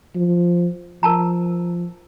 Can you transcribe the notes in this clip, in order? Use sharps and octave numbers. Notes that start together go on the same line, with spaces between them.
F3
F3 A#4 A5 A#5